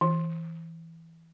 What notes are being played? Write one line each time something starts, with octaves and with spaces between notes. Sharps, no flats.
E3